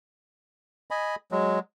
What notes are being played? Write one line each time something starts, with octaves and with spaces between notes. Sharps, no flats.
D#5 G#5 B5
F#3 G#3